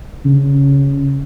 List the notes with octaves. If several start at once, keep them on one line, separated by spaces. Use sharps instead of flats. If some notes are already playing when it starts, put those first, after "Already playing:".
C#3